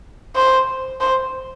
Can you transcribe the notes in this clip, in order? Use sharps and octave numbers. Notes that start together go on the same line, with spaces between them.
C5
C5